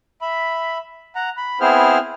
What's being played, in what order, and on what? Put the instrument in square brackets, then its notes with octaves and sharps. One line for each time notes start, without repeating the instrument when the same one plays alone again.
[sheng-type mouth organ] E5 B5
F#5 A#5
B5
B3 C4 E4 G#4 C5 F6